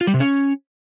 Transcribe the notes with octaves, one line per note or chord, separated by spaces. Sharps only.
F4
G3
C3
C#4